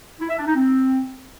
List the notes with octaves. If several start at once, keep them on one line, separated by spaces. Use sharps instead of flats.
E4
E5
D4
D#4
C4